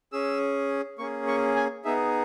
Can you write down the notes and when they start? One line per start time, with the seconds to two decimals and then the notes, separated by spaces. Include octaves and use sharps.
0.13 C#4 G#4 E6
0.99 A#3 C#4 G#4 C#6
1.27 C#6
1.56 G#5
1.85 B3 D#4 G#4 E5